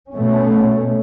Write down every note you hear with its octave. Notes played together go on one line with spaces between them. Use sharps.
B2 A3 C#4